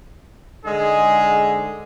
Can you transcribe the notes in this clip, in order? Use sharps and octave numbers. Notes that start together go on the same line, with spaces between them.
G#2 D3 G#3 G#4